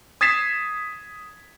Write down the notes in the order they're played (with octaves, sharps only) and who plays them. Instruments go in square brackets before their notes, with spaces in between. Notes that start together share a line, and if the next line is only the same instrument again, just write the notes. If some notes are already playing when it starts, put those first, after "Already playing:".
[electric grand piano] D#6 G#6 A6 B6 C7 E7